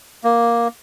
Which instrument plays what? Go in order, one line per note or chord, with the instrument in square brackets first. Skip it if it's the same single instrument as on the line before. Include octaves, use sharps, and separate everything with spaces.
[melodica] A#3